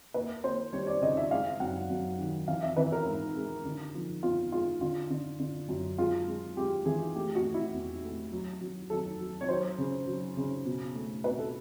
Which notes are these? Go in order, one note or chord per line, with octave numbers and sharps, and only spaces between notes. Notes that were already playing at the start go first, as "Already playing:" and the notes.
A#3 B4
A#3 C5
G3 C#5
D5
C#3 D#5
E5
G#3 F5
F#2 F#5
F#2
D#3
E3 F5
E5
E3 B4
A#4
G#2
G#3
D3
F3
B3 F4
G#3 F4
D3 F4
D3
D3
F#2
G#3 F4
G#3
G#3 G4
E3 G#4
A3 G4
F#4
A3
E4
E2
A3
F#3
F#3
F#3 A4
F#3
C#5
F#3 C5
C#3
F#3
C#3
B2
A3
B2 B4
A4